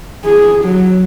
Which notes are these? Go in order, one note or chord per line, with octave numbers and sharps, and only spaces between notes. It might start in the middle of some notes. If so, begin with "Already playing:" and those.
G#4
F#3